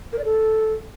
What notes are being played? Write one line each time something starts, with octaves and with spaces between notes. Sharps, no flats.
A#4
D5
A4